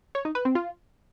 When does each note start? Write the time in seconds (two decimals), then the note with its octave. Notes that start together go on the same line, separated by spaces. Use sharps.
0.15 C#5
0.25 D#4
0.35 B4
0.45 C4
0.55 F4